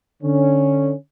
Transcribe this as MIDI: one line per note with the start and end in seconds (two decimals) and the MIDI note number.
0.22 0.93 50
0.22 0.93 61